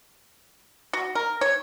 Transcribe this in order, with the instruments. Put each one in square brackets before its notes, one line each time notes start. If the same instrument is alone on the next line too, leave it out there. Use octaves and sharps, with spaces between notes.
[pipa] F#4
A#4
C#5